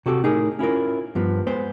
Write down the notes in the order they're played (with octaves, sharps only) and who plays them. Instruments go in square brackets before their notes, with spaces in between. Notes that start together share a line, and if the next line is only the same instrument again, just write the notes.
[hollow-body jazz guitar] C3 F#4 G4 A4
A2 D#4 G#4 A#4
C#4 E4 F4 A#4
G2 F3 B3
G#3 B3 C5